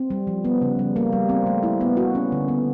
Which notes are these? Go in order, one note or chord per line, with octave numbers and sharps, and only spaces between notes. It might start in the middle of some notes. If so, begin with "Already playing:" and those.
Already playing: C4
G3
F3
B3
C#3
G3
A#3
G3
C4
A3
E4
B3
F#4
C#4
D3
B3